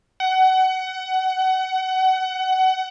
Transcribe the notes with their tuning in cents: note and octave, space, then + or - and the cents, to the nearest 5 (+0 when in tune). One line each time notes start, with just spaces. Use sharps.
F#5 +25